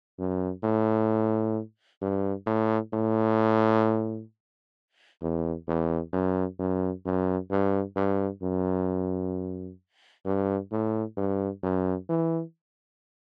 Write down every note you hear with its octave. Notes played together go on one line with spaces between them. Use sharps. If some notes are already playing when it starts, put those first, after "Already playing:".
F#2
A2
G2
A2
A2
E2
E2
F#2
F#2
F#2
G2
G2
F#2
G2
A2
G2
F#2
E3